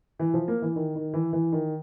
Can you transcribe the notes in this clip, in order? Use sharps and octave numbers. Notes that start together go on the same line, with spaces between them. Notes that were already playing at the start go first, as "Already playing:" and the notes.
E3
F3
A#3
E3
D#3
D#3
E3
E3
D#3